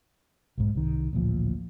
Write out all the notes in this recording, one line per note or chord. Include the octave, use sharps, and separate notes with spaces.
B1 G#2
C2 D#3
A1 D2 A#2 F3